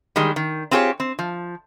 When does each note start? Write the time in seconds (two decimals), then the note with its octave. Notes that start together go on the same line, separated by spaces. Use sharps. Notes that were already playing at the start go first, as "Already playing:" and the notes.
0.16 D#3 G3 G#3
0.36 D#3
0.71 C4 F4 G4 G#4 C#5
1.00 C4
1.19 F3